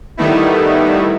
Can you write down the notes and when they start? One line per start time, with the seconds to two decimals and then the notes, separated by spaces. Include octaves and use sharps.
0.17 D#3 G3 A3 B3 D#4 E4